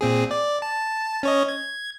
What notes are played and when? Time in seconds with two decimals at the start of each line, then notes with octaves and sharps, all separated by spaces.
0.01 A#2 C4 G#4
0.31 D5
0.62 A5
1.23 C#4 C#5 D#5
1.48 G#6